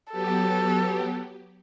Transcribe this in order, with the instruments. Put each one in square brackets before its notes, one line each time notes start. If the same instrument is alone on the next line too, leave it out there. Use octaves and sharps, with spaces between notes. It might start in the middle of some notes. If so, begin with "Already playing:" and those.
[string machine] F#3 B3 G4 [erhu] A4